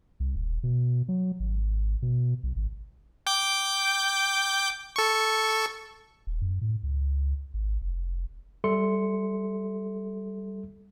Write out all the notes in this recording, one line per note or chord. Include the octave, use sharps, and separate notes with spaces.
C2
D#1
B2
F#3
G#1
B2
B1
G#1
G5 D6 G6
A4 C#6
D#1
F#2
A2
C#2
G#1
F1
G3 A4 E5 C6 C#7